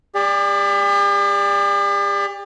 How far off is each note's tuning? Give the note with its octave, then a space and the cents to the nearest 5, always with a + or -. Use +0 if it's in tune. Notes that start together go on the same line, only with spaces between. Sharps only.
G4 +45 D5 +0